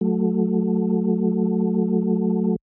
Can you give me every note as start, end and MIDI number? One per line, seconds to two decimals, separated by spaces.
0.01 2.56 54
0.01 2.56 57